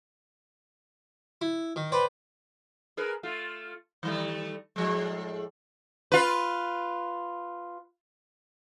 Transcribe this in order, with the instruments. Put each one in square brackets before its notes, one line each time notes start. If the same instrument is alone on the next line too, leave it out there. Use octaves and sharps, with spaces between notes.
[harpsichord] E4
D#3
[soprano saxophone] B4 [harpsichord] C5 D5 G5
[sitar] G#4 A#4 B4
A3 F4
D#3 G3 A3
A2 F3 G#3
F4 B4